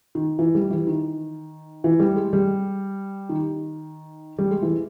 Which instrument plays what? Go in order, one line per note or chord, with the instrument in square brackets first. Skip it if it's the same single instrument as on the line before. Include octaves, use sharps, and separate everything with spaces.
[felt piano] D#3
E3
G3
E3
D#3
E3
G3
G#3
G3
D#3
G3
G#3
E3